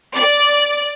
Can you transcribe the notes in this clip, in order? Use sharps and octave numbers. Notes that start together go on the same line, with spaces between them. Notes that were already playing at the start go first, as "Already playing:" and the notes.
D5